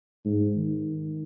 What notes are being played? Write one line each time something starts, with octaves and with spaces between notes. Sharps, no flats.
G#2
D#3